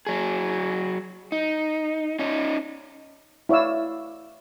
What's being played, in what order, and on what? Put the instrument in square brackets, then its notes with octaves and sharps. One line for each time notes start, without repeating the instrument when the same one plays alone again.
[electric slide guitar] F#3 G#4
D#4
C#4 D#4
[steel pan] E4 C#5 D5 F5 E6